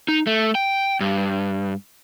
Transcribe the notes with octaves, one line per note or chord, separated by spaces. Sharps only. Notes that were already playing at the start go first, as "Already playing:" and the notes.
D#4
A3
G5
G2